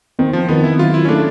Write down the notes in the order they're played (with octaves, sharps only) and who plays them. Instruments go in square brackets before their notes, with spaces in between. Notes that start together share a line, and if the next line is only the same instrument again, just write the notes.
[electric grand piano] D#3 [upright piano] C4
[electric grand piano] F3
[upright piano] D#3 [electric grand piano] B3
[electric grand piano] E4
[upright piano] F#3 [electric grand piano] F4
[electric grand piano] E4
C#4
[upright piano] A3 [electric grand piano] D4